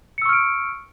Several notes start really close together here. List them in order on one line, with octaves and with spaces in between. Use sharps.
C#7 E6 C#6 F6 D7